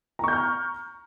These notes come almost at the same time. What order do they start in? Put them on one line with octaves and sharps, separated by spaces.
A#5 C#6 G6 F6